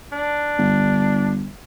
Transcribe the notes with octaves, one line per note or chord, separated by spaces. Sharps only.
D4
G1